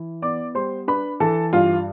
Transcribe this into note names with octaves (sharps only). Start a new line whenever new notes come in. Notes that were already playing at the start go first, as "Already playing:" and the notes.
Already playing: E3 E4
B3 D5 D6
G3 C5 C6
D4 B4 B5
E3 A4 A5
G2 F4 F5